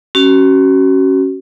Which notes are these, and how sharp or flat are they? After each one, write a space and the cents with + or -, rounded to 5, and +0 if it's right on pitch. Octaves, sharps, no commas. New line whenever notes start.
C#4 -15 F#4 +30